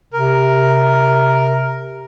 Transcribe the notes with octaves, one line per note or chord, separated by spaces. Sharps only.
C3 A#4